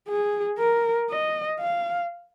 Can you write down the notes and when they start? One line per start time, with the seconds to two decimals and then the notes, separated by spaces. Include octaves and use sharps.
0.08 G#4
0.58 A#4
1.10 D#5
1.60 F5